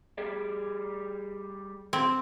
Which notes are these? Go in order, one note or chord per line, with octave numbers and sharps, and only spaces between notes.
G3 G#4 D5
C4